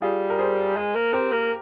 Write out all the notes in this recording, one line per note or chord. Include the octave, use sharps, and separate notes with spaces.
G3 F4 G#4
A#4
G#4 C5
G#3
A#3
C4 G4 A#4
A#3